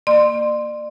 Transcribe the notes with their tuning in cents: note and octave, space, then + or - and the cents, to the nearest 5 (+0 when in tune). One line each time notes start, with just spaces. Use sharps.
A#3 -15 D5 +35 C6 +0